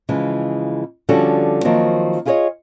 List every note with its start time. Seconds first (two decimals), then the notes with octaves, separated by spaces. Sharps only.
0.09 C#3 E3 F3 G#3
1.09 D3 F3 G3 C#4 F#4 A4
1.64 D#3 F3 F#3 A#3 C4
2.25 E4 F4 G#4 B4 C#5 D#5